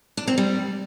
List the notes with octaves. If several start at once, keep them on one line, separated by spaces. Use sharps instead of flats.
D4
C4
G3